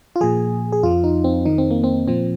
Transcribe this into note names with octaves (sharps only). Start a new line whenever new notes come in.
F4
A#2 F3 G#4
G#4
F2 F3 F4
D#4
C4
F2 D#3 D#4
C4
A#3
C4
A#2 F3 C4